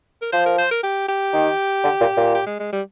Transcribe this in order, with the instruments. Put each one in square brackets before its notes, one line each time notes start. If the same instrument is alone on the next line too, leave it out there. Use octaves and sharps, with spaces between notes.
[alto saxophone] A#4
[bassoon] F3 [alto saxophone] C5
[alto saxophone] A#4
C5
A#4
G4
G4
[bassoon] D#3
D3
A#2
A#2
[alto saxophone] G4
G#3
G#3
G3